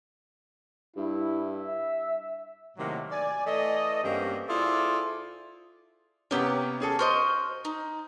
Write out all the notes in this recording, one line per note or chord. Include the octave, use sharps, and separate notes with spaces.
G2 E4
E5
A2 C3 D#3 F#3 A3 A#3
D5 G#5
E3 A3 D5 D#5
G2 A#3 C4 C#4 F#4 G4
E4 F4 G#4 A4 C5 D5
C3 A#3 B3 C#4 G4
C#4 G#4 A4
F#4 C5 D#5 F6
D#4